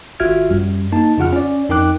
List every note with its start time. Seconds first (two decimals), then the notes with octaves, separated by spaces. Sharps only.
0.20 G#1 F4 F#4 E5 F6 G#6
0.50 F#2 G3
0.92 A#3 D#4 A5
1.18 F2 C#3 F4 F#5 F6
1.33 C#4 D5
1.69 F2 D#4 A#4 G5 D6 F#6